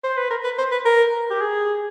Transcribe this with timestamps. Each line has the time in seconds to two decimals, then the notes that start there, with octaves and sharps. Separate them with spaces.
0.04 C5
0.17 B4
0.30 A#4
0.44 B4
0.58 C5
0.72 B4
0.85 A#4
1.30 G4
1.41 G#4